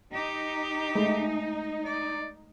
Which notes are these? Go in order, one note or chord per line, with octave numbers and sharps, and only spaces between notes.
D#4 G4
G#3 A3
D5